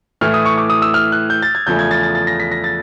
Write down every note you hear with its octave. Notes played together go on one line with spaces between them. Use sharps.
A2 E3 A3 F6
D#6
C#6
D6
D#6
E6
F6
F#6
G6
A6
G#6
E2 C#3 F3 A3 G6
G#6
A6
A6
A6
A#6
B6
A#6
A6